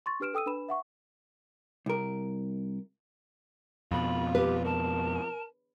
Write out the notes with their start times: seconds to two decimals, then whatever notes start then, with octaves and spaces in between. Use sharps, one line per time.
0.06 C6 C#6 A6
0.20 D4 G4 B4 F6 D7 E7
0.34 A4 G5 D#6 E6 D#7
0.46 D4 B4 B5 E7
0.69 E5 F#5 C#6
1.86 C2 A#4
3.91 F2 B2 F4 B5
4.35 G4 B4
4.65 A#4 A5